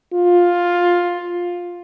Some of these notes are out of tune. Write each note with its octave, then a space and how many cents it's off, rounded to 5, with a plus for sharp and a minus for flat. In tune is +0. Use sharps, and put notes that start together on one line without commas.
F4 +10